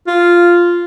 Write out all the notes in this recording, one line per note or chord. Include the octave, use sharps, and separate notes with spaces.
F4